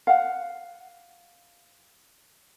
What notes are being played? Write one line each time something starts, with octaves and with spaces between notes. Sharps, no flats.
F5 F#5